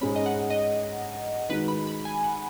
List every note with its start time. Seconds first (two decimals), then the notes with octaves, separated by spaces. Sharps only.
0.01 G#2 G#3 C#4 B5
0.16 D#5
0.26 F#5
0.50 D#5
1.49 D#3 G#3 D#4 F#4 B4
1.68 B5
1.87 B5
2.05 G#5
2.24 F#5